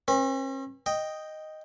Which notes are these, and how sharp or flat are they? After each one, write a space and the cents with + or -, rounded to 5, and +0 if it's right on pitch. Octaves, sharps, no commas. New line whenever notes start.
C#4 -45 B4 -25
D#5 +0 G5 +0